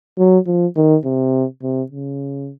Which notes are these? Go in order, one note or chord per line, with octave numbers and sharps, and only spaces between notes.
F#3
F3
D#3
C3
C3
C#3